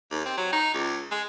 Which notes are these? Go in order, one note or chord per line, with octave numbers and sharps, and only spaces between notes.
D#2
C4
F#3
D#4
C#2
G#3